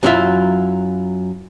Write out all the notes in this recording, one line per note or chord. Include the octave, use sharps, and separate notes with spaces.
F#2 F#3 C#4 E4 F4 E5